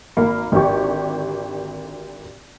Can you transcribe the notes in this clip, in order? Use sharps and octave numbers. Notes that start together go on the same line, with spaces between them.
G#1 A#3 B5
G#1 D3 C4 G4 D5 C#6